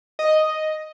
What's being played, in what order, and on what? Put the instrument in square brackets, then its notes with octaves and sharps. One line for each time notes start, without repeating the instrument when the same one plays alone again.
[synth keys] D#5